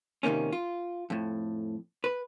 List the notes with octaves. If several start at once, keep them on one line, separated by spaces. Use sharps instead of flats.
F2 C3 D#3 A#3 C#4
F4
F2 A2
B4